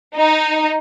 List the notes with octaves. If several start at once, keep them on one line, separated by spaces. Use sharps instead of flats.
D#4